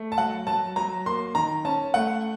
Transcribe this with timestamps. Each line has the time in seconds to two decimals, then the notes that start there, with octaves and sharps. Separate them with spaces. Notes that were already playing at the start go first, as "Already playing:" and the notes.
Already playing: A3
0.12 A5
0.18 F#3 F#5
0.47 F#3 A5
0.76 F#3 A#5
1.06 A#3 C6
1.35 D#3 A#5
1.65 C#4 A5
1.94 A3 F#5